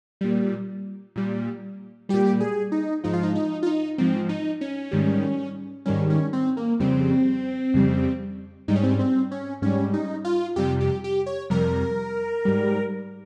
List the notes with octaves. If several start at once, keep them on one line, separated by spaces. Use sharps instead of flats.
A#2 G3
A#2 G3
A#2 G3 G4
G#4
D#4
G#2 F3 D#4
F4
D#4
D#4
F4
D#4
G#2 F3 C4
D#4
C#4
G#2 D#3 G3
G#2 D#3 G3 C#4
C#4
C4
A#3
F2 C#3 G3 C4
F2 C#3 G3
G#2 G3 D#4
C#4
C4
C#4
C4
C#4
G#2 G3 C#4
D#4
F4
F2 C3 G3 G4
G4
G4
C#5
F2 C3 G3 A#4
G#2 G3